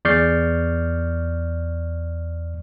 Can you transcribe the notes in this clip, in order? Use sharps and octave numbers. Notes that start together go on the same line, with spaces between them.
E2 D5 C#6 F6 G6 C7